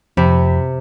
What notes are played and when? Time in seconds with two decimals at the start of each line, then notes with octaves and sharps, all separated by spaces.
0.17 F2 C3 B5